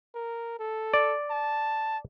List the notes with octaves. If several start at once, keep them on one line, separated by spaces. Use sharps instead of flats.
A#4
A4
D5
A5